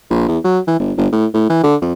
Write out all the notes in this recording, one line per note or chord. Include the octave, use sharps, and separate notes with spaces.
A#1
E2
F#3
E3
G1
G1
A2
A2
E3
D3
F2